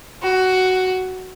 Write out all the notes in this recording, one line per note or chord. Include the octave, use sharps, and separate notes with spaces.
F#4